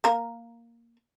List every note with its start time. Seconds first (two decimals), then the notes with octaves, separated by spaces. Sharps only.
0.04 A#3 A#4